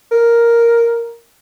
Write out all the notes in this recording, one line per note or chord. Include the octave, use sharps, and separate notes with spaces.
A#4